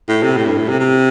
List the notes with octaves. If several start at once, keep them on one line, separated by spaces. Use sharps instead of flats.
A2
C3
A2
G2
A2
C3
C3